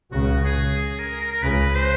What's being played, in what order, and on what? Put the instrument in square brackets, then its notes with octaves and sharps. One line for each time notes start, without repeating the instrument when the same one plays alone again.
[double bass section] C#2 C#3 [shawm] F#4
[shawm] G#4
G#4
A#4
A#4
A#4
[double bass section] C#2 C#3 [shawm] B4
[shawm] C5